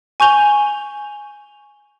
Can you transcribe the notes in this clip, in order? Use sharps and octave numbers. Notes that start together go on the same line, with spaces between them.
G#5 C#6 G6 F7 G7